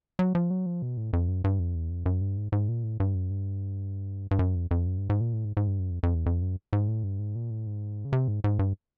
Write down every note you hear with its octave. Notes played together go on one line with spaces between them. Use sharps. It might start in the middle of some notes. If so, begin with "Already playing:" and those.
F#3
F3
F#3
F3
B2
A2
F2
F#2
G2
F2
E2
F2
F#2
G2
G#2
G#2
A#2
A2
G2
F#2
G2
G2
F#2
F2
F2
F#2
G2
G#2
A#2
A2
G#2
G#2
G2
F#2
F2
F2
E2
F2
F#2
G#2
A2
G2
G#2
A#2
A2
G#2
C#3
C3
G#2
G#2
G2